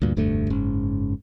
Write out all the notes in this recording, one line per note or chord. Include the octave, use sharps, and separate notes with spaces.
D2 G2 A#2
F1 D2 G2 A3
F#1 G#2 C#4